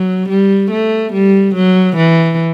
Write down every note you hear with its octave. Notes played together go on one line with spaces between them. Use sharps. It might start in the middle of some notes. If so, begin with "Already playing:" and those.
Already playing: F#3
G3
A3
G3
F#3
E3